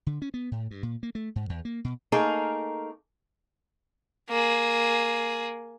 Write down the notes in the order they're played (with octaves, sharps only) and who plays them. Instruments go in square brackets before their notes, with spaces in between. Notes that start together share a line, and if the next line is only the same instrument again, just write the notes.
[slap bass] D3
C#4
B3
A2
G2
A#2
A#3
A3
G#2
E2
A#3
B2
[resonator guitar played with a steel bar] A3 A#3 D#4 G#4 A#4
[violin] A#3 G#4